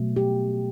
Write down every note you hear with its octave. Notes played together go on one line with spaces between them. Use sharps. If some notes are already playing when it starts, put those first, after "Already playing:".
Already playing: B2 F#3 A3
G4